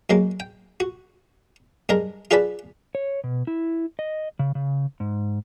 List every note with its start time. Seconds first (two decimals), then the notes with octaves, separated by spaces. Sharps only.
0.10 F#2 G#3 A#3
0.40 G5
0.80 F#4
1.89 G2 G#3 A#4 A#5
2.31 F4 G#4 B4 D5 A5 B5
2.95 C#5
3.24 B2
3.47 E4
3.99 D#5
4.39 C#3
4.55 C#3
5.00 G#2